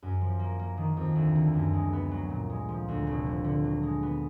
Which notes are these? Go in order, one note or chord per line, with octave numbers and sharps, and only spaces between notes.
F#2
F3
A#3
A#3
D#3
F2
D2
D3
F#2
G#3
B3
F#3
A#2
G#3
F3
D2
F1
F3
D3
F#3
G#3
B3